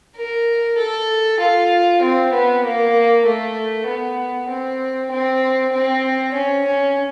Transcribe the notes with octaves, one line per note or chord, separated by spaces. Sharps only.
A#4
A4
F4
C4
B3
A#3
A3
B3
C4
C4
C4
C#4
C#4